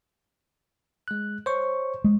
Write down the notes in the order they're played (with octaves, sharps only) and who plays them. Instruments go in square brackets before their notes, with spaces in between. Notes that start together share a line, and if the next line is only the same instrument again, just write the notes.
[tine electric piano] G#3 F#6
C5 C#5 C#6
[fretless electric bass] G#3